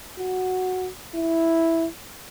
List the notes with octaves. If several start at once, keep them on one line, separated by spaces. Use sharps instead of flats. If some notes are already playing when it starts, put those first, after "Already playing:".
F#4
E4